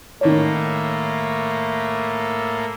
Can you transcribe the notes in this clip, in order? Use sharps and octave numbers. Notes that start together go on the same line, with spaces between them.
A2 D#3 A3 A#3 C#5